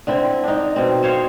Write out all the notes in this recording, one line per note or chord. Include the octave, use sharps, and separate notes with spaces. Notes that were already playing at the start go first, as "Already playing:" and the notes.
D3 C4 E4
D4 D#4
B2 C4
C5 C#5 F5